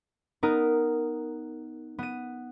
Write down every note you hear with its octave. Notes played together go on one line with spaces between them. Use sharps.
B3 D#4 A#4
B3 D#7